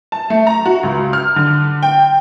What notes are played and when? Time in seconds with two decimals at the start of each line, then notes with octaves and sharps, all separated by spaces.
0.12 A5
0.30 A3
0.47 A#5
0.65 F#4
0.83 C#2
1.13 F6
1.36 D3
1.83 G5